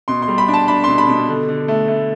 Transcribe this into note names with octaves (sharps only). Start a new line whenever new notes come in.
B2 C6
C6
G3
B5
D4
A5
D4 B5
B2 C6
B5
B2
D3
D3
A3
A3